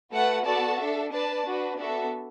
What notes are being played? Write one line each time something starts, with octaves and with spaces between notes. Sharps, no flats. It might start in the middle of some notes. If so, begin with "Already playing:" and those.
A3 F#4 B4 F#5 A5
B3 F#4 A4 D5 A5
D4 A4 E5
D4 B4 D5 A5
D4 F#4 B4
B3 D4 F#4 A4 E5